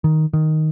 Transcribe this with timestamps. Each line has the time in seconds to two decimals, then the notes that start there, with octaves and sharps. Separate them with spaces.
0.04 D#3
0.33 D#3